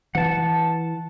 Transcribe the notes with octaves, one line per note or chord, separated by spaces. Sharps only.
E3 F#5 A5